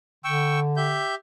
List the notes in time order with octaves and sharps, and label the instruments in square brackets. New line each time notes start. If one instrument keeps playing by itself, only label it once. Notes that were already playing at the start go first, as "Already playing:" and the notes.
[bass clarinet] D3 [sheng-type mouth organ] G5 C#6 E6
[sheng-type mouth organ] G4 E5 G6